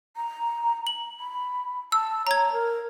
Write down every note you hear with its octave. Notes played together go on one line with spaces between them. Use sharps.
A#5
F#7
B5
A5 E6
C#5 A#5 G#6
A#4